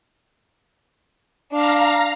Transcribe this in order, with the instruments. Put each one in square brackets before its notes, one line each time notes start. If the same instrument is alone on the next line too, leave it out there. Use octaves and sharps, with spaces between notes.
[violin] D4 [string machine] F5 A#5